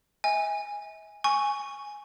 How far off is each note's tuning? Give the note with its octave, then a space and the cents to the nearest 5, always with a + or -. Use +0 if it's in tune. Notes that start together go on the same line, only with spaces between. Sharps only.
E5 -40 G#5 -10
G#5 +0 C#6 +0